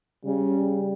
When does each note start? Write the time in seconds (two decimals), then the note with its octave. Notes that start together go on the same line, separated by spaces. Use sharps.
0.25 C#3 G3